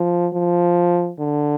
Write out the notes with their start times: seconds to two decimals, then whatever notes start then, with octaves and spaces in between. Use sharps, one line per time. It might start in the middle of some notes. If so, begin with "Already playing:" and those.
Already playing: F3
0.33 F3
1.19 D3